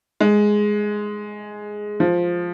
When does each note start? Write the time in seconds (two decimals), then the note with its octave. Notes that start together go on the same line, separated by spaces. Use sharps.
0.21 G#3
2.00 F3